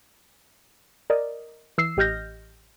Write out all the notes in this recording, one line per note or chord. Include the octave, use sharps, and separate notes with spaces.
A#4 D5 D#5
E3 E6 C7
A1 G4 D#5 F6 G6 A#6